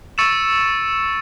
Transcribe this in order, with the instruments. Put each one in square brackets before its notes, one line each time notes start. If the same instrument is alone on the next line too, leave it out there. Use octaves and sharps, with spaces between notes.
[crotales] C#6 E6 A6 C#7 E7